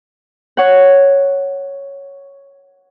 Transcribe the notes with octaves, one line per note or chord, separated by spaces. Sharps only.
C#5 F#5